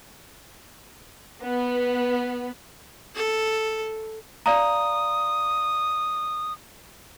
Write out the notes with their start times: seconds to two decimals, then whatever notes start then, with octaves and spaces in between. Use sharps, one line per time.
1.43 B3
3.15 A4
4.46 D5 F5 A#5 D#6